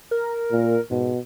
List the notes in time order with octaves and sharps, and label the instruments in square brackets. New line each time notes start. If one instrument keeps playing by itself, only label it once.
[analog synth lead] A#4
[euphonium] A#2
[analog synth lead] G#2 [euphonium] B2